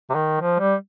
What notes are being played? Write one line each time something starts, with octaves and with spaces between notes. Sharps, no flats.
C3
D#3
F3
G3